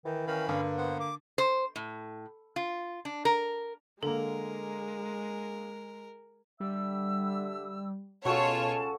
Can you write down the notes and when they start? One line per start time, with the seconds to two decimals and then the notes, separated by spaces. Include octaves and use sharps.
0.05 D#3 E3
0.27 D#3 C#4 F5 B5
0.49 G2 D3 A#3
0.77 B3 C5 F#5
1.00 D6
1.38 C5
1.76 A2
2.56 F4
3.05 D4
3.25 A#4
4.03 D3 G#3 A#3 A4 A#4
6.60 D3 G3 E5 E6
8.25 C#2 B2 C#4 F4 F#4 A4 C#5 A5